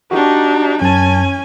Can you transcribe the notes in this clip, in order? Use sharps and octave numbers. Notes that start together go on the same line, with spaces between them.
D4 D#4 F#4 G4
F#2 C#4 G#5 A5